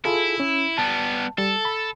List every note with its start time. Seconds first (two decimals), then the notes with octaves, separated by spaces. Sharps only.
0.05 E4 F4 G#4 A4
0.40 C#4
0.78 G3 B3 A5
1.38 G3 A4
1.65 B5